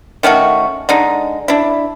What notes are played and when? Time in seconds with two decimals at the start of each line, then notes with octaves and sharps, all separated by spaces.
0.23 D#3 A3 C#4 F#4
0.89 D3 G#3 D#4
1.48 D4 E4